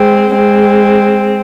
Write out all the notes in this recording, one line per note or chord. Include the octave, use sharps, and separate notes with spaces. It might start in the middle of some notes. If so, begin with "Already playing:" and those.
Already playing: G#3 C4
G#3 C4